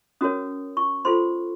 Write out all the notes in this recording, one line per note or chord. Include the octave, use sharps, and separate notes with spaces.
C#4 F#4 A#4 C#5 D#6
C#6
F4 A4 C5 C6